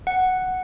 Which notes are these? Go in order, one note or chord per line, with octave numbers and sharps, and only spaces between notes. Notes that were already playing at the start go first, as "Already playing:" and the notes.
F#5